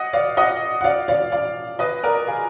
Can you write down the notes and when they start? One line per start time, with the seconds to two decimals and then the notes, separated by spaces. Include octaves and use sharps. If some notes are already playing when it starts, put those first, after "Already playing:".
Already playing: D#5 F#5
0.13 D5 F5
0.37 D#5 F#5
0.81 F#5
0.84 D5 F5
1.08 D5 F5
1.32 D5 F5
1.79 B4 D#5
2.03 A#4 D5
2.27 F4 G#4